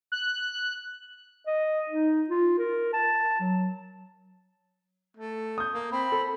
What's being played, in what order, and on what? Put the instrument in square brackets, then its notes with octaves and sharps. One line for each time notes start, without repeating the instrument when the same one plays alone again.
[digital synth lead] F#6
[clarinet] D#5
D#4
F4
A#4
A5
F#3
[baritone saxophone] A3
[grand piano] D#6 G6
[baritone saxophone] A#3
[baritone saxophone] C4 [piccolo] B5
[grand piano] A4